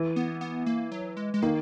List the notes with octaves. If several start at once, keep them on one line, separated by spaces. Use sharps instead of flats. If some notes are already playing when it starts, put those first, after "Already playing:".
Already playing: E3
B3
B3
A#3
F#3
G#3
G#3
D#3 A#3